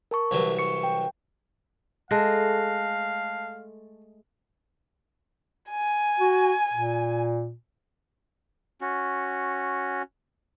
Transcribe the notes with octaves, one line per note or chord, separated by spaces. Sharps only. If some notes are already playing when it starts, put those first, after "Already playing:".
A#4 A5 C#6
C2 E3 F#3
C#6 C#7
G5
G#3 A3 F5 A5 F#6 A#6
G#5
F#4
A#2
C#4 F#4